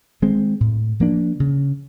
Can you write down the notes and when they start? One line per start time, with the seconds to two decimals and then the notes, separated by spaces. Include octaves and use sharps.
0.22 D#3 G#3 C4
0.61 A2
1.00 F3 A#3 D4
1.40 C#3